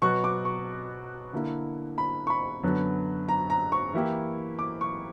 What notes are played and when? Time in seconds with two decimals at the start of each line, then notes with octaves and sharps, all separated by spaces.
0.02 B2 F#3 B3 F#4 C#6
0.24 D6
0.45 C#6
1.33 D3 A#3 E4
1.98 B5
2.27 C#6
2.30 B5
2.63 F#2 D3 F#3 B3
3.29 A#5
3.50 A#5
3.72 C#6
3.93 E3 A#3 E4 G4
4.59 D6
4.81 C#6